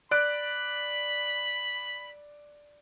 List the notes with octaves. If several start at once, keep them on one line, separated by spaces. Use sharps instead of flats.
D5 B5 F#6 D7